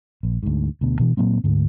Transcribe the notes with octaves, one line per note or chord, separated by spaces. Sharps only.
A#1
D2 G#2
D2 B2 B3
B2 E3
A#2 F#3 A#3 C4
D2 G#2 D3